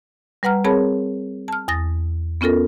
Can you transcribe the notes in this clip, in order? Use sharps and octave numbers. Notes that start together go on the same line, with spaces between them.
G3 B4 F#5 A#5 F6
C4 G#4 A#4 C#5 A5 B5
A5 F6
E2 D#6 A6 A#6
B3 C#4 F4 A4 A#4